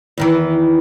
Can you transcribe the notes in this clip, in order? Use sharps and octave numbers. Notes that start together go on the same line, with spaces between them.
E2 D#3 E3